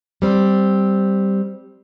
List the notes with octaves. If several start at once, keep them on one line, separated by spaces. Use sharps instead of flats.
G3 C4